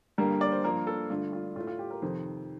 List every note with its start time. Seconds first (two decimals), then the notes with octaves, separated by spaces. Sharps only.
0.18 G2 D3 G3 A#3 A#4
0.41 D5
0.52 C5
0.64 G2 F3 A#3 A#4
0.87 A4
1.10 G2 D3 A3 F4
1.33 F4
1.56 A2 A3 F4
1.67 F4
1.79 G4
1.91 A#4
2.02 F2 C3 D#3 C5